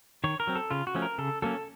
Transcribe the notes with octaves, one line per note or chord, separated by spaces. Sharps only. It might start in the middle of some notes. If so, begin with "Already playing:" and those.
D#3 C#5
A#4
F#3 C4
A4
C#3 F4
F#4
F3 A3 C#4
A#4
C#3 A4
F#3 A#3 C#4 A4